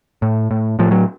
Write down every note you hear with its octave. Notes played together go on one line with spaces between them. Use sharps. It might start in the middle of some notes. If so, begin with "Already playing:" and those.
A2
A2
A2 F3
F#3